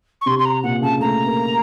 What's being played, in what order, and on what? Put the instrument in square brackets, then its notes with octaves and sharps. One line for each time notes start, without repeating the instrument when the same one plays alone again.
[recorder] C#6
[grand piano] C3 [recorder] C6
[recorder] C6
A#5
[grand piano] A#2 [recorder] F#5
[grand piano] C#3 [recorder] A5
[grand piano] A3 [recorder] A#5
[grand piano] A#3